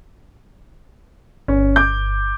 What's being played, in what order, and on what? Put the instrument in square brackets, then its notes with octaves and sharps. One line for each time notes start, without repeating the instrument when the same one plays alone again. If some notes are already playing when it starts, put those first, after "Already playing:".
[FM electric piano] G1 [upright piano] C#4
[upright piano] D6 G6